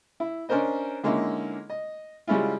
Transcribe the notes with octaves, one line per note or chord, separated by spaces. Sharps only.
E4
C#4 D4 A#4 C5 D#5
D3 G#3 A#3 C#4 D#4 E4
D#5
C#3 G3 G#3 C#4 E4 F4